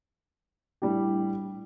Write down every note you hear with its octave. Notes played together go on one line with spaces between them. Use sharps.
A2 G3 D4 G4